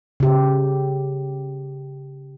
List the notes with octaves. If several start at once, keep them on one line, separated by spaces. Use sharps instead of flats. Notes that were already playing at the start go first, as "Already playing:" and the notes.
C#3 G4